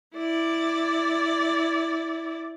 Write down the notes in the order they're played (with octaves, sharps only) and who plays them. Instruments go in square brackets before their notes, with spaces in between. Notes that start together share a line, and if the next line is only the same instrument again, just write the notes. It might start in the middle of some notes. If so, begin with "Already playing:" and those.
[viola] E4 D5